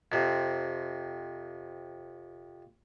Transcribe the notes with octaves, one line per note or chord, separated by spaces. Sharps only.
F2 C3